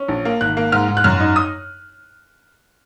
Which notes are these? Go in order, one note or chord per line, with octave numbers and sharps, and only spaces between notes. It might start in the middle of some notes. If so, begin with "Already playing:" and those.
Already playing: C#4
A#1
A#3
G#1 F#6
A#3
G#2 F6
G#2
F#6
F#2 F6
D#4
D#6